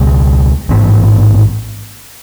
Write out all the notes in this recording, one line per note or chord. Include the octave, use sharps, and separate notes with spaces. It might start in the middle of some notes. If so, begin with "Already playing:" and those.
Already playing: C#2 B2 G#3
A1 G#2 E3 B3